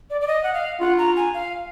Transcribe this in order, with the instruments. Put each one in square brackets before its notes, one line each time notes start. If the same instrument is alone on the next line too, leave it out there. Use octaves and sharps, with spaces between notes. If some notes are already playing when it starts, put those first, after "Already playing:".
[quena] D5
D5
D#5
F#5
F5
[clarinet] F4 [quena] F#5
[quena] A#5
G#5
F5